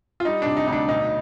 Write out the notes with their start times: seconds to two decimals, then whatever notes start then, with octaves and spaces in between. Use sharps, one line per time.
0.20 F4
0.25 G3 D#4
0.42 C3 D4
0.57 D#4
0.67 D2 D#4
0.73 D4
0.88 B1 D#4